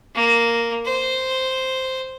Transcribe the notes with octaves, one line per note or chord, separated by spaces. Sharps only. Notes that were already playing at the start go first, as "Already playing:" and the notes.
A#3
C5